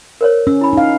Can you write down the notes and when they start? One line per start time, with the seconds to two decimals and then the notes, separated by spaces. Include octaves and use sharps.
0.21 A#4 C5 C#5
0.47 C#4 E6
0.61 E4 B5
0.73 D#4 F5